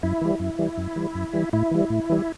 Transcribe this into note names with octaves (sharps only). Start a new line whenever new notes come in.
F#2 E4
E3 G3
F#2
E3 G3
F#2
E3 G3
F#2
E3 G3
A2 E4
E3 G3
A2
E3 G3